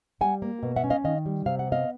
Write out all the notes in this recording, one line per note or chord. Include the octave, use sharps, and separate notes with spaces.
G3 F#5 G#5
A#3
B2
E5 F#5
C#4
D#5 F5
D#3 D#5 F5
G3
C3 F5
F#5
B3
D#5 F5